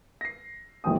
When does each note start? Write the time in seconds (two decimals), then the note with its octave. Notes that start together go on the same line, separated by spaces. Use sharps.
0.21 A#6 C7
0.84 D1 A#1 G#2 F#3 G5 D#6